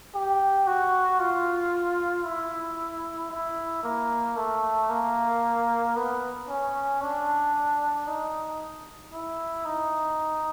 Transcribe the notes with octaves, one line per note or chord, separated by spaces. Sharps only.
G4
F#4
F4
E4
E4
A#3
A3
A#3
B3
C#4
D4
D#4
E4
D#4